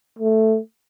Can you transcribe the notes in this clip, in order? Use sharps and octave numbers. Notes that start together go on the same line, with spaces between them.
A3